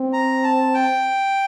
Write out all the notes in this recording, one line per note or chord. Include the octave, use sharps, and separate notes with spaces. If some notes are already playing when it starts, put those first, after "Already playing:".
Already playing: C4
A#5
A5
G5